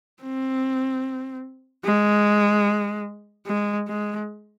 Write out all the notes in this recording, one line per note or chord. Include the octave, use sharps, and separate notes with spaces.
C4
G#3
G#3
G#3